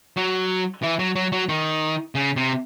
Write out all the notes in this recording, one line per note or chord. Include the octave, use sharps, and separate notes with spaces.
F#3
E3
F#3
F#3
F#3
D#3
C#3
C3